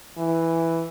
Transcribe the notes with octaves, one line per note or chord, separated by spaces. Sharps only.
E3